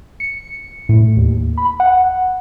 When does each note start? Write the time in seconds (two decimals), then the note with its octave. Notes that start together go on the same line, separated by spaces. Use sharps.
0.20 C#7
0.89 A2
1.17 D#2
1.58 B5
1.80 F#5